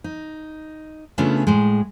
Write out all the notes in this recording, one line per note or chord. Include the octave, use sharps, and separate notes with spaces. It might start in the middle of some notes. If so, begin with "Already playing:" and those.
D#4
C#3 A3 B3 C#4 D4 F4
A2 G#3